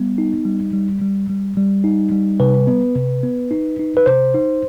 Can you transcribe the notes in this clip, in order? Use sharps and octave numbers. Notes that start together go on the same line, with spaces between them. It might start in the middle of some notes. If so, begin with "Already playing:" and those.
Already playing: G3 B3
D#4
G3
G3
G3
G3
G3
D#4
G3
C3 B4
B3
C3
B3
D#4
D#4
B4
C3 C5
D#4